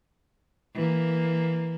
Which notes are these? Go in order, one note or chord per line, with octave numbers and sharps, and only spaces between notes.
E3 A#3